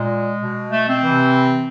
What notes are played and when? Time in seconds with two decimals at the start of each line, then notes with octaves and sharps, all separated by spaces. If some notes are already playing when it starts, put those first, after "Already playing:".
Already playing: A#2 G#3
0.39 B2
0.71 A3
0.87 C4
1.02 C3 E3